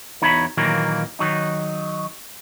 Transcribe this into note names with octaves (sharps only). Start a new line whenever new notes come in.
E2 D#4 F#4 C#5 B5
A#2 D#3 E3 F#3 A#3
D#3 F#3 D#4